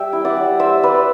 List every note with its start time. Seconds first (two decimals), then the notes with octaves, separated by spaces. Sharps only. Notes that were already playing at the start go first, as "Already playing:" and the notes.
Already playing: G3 E5 G5
0.13 E4
0.25 D5 F#5
0.36 G3
0.59 G3 C5 E5
0.83 G3 B4 D5